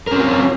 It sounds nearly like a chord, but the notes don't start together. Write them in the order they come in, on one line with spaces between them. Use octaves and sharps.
A#4 C#4 C4 F4